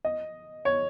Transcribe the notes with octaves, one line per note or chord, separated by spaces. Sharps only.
D#5
C#5